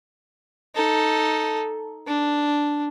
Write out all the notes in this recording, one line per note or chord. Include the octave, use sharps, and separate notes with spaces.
D#4 A4
D4